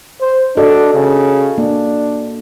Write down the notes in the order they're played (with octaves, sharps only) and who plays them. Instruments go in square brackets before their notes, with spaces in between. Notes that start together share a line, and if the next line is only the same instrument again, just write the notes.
[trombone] C5
[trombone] D4 [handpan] F#4 A4 D#5
[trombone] C#3
[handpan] A#3 [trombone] D4